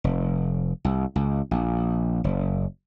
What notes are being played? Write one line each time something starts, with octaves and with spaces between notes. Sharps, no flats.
F1
C2
C#2
A#1
F#1